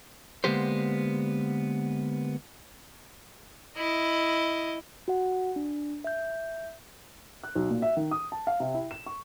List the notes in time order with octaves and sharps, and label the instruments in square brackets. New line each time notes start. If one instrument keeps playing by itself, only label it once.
[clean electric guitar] D3 G#3 A#3 B3 G4 C5
[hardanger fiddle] E4 D#5
[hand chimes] F#4 F#5
D4
E5 G6
[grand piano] F#6
B1
A#2
E5
D#3
D#6
A5
F5
C3
E4
E7
C#6